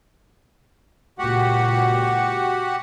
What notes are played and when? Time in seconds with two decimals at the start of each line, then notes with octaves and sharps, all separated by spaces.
1.19 C#2 A#2 F#4 G4 F#5